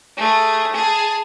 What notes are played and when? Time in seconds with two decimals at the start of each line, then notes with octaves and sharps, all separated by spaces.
0.17 A3 G#4
0.73 G#4 A5